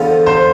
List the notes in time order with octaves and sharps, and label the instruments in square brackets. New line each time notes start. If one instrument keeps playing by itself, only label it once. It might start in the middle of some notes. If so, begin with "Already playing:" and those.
Already playing: [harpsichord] E2 D3 F3 B3 F4
[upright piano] C5